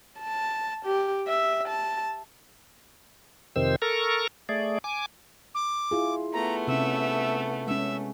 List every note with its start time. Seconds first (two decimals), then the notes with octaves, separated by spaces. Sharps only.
0.19 A5
0.85 G4
1.28 E5
1.68 A5
3.56 F2 C3 D#3 C5 E6
3.82 A4 A#4 A#5 C#6
4.49 A3 G#4 D5
4.84 G#5 D6
5.55 D6
5.91 E4 F4 G#4
6.33 A3 B3 A#5
6.67 C3 C#4 E5
7.67 G#3 C#4 E5